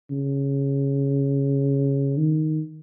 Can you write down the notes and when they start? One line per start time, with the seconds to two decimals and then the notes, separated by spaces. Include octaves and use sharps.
0.11 C#3
2.17 D#3